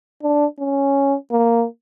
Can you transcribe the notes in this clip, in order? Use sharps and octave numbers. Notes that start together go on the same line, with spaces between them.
D4
C#4
A#3